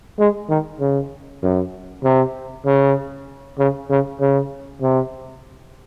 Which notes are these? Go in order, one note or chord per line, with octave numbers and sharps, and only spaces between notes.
G#3
D#3
C#3
F#2
C3
C#3
C#3
C#3
C#3
C3